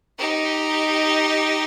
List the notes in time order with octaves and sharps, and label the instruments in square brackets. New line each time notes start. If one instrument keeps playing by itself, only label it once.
[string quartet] D#4 G4